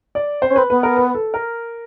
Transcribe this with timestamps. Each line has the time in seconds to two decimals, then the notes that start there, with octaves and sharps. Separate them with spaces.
0.15 D5
0.42 C4 C5
0.50 C#4
0.56 C4 B4
0.70 B3 B4
0.83 A#4
0.97 B4
1.15 A4
1.34 A#4